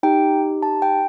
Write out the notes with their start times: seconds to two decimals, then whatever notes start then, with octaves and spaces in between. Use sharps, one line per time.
0.03 D#4 G4 G5
0.63 A5
0.82 G5